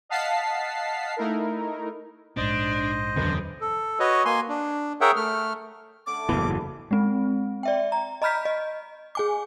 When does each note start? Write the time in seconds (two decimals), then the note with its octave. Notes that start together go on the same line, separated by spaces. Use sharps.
0.09 D#5 F5 F#5 A5 B6 C7
1.17 A3 D#4 E4 A#4
2.37 A#1 G#2 D4 C5 D#5
3.16 E1 F#2 D3 B4
3.61 A4
3.99 F#4 B4 C#5 D#5
4.25 A#3 G#5 C6
4.49 D4
5.01 G#4 A#4 C#5 E5 F#5 G5
5.16 A3 F6
6.07 D3 A3 C#4 D6
6.29 F#1 E2 A2 E3 B3
6.91 G#3 C4
7.63 D5 E5 G5
7.92 A#5
8.22 D#5 A#5 B5 F6 G6 B6
8.45 D#5
9.15 G#4 G#5 D6